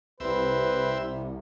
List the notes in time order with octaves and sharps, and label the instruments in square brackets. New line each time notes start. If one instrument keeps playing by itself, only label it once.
[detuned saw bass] C2 [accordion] C3 G3 [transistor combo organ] C4 E5 [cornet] B4